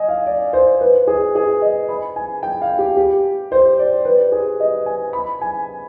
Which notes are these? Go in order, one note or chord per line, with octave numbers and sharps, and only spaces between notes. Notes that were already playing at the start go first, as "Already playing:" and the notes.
Already playing: D#5 G#5
F5
D5
C5
B4
G#4
G#4
D#5
B5
G#5
G5
F5
G4
G4
C5
D5
B4
G#4
D#5
G#5
B5
G#5